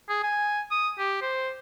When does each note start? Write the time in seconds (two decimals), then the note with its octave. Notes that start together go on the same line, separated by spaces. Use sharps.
0.09 G#4
0.23 G#5
0.71 D#6
0.99 G4
1.22 C5